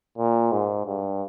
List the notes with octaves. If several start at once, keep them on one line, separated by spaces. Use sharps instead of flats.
A#2
G#2
G2